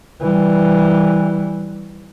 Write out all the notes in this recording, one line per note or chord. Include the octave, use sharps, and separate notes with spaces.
E3 G3